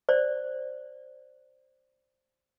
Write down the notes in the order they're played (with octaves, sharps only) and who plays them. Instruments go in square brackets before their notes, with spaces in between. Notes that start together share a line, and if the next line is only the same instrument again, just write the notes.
[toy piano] C5 D5